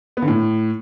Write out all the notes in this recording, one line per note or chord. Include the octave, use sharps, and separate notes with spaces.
B3
D3
A2